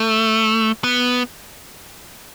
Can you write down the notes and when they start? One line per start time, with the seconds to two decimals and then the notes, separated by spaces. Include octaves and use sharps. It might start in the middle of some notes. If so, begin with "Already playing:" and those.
Already playing: A3
0.84 B3